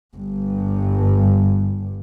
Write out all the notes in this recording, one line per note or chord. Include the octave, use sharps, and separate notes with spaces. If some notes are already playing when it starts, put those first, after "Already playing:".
G1 G2